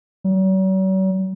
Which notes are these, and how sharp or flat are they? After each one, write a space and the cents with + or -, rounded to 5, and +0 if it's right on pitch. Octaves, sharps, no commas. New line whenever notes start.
F#3 +45